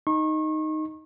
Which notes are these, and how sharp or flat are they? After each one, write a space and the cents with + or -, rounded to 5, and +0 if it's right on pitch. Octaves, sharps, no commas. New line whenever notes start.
D#4 +0 C#6 -35